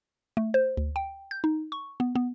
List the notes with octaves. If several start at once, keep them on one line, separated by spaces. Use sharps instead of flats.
A3
C5
D2
G5
G6
D#4
C#6
B3
B3